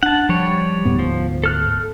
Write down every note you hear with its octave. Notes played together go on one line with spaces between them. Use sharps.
D4 F#5 A5
F3 G3 C#5
D2 G#2 B3
F3
A4 F6 F#6